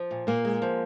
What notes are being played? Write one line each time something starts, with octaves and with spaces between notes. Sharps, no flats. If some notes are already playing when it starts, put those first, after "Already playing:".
Already playing: F3
A#2
A#2 A#3
G#3
F3